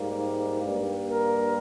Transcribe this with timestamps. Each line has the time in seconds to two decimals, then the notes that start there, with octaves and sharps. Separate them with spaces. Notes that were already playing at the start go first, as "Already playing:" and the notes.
Already playing: G#2 G3 A#3
0.63 G2 G3 A#3
1.09 A#4